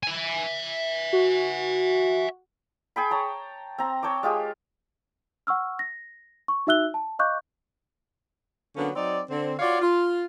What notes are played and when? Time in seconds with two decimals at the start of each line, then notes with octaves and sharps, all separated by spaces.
0.03 E5 G#5
1.13 F#4
2.96 G#4 G5 B5
3.11 C#5 A5 A#5
3.78 C4 A#5
4.03 C#5 G5 A5 D6
4.23 G#3 F4 G4 G#4
5.47 F#5 C#6 E6 F6
5.79 A#6
6.48 C#6
6.67 D#4 F#4 E5 E6 F#6 G7
6.94 A5
7.19 D#5 F5 C#6 D6 F#6 G6
8.76 D3 F#3 A#3 B3 C#4
8.95 F#3 C4 D#4 D5
9.29 D3 C4
9.59 F4 F#4 C#5 D5 F5
9.81 F4